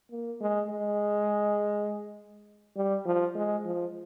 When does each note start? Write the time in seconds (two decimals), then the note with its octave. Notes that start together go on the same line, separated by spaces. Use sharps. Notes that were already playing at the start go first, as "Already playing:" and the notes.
0.11 A#3
0.41 G#3
0.70 G#3
2.76 G3
3.06 F3
3.36 G#3
3.65 F3